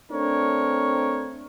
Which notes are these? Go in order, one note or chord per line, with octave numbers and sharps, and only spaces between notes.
A3 C4 D4 A#4 C#5